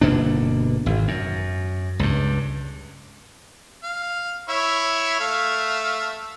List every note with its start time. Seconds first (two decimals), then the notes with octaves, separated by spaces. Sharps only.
0.01 G1 B2 A#3 D4
0.86 G#1
1.08 F#2
1.99 C#2 G2
3.83 F5
4.49 E4 C#5 E5
5.20 A3 E5 F5